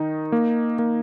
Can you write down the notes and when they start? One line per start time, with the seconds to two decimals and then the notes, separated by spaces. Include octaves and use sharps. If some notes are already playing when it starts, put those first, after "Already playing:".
Already playing: D#3 D#4
0.32 A#3
0.79 A#3